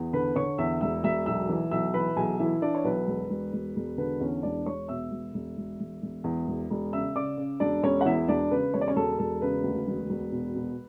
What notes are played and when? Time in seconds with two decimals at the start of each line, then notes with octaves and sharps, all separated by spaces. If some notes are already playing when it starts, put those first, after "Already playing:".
Already playing: E2
0.13 D3 B4 B5
0.36 D3 C#5 C#6
0.58 E2 E5 E6
0.81 E1 E5 E6
1.03 E1 E5 E6
1.26 B1 E5 E6
1.49 E3
1.71 B1 E5 E6
1.94 E3 B4 B5
2.17 B1 G#4 G#5
2.39 E3 E4 E5
2.62 E3 D4 D5
2.75 C#5
2.85 B1 B4
3.07 E1
3.30 E1
3.53 E1
3.76 E1
3.98 D3 B4
4.20 E2 C#4 C#5
4.43 E1 D4 D5
4.66 E1 C#5 C#6
4.88 B2 E5 E6
5.11 E1
5.34 E1
5.57 E1
5.79 E1
6.02 E1
6.24 E2
6.47 E1
6.70 E1
6.92 C#3 E5 E6
7.15 C#3 D5 D6
7.37 C#3
7.60 E1 D4 D5
7.82 E1 C#4 C#5
8.01 F#5
8.05 E2 E4 E5
8.28 E1 D4 D5
8.51 C#3 B4
8.73 E1 C#5
8.81 D5
8.88 C#4 C#5
8.96 E1 A4
9.19 E1 A4
9.42 C#3 B4
9.64 D2
9.87 E1
10.09 E1
10.32 B2
10.55 B2